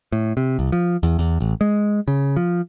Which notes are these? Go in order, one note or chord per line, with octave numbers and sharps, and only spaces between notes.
A2
C3
C2
F3
E2
E2
A1
G#3
C#3
F3